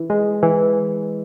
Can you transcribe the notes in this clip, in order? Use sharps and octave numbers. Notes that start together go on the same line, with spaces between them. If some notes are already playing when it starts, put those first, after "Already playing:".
Already playing: E3
G#3
E3